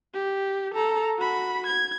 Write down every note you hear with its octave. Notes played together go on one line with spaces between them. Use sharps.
G4
A4 A#5
F#4 B5
G#6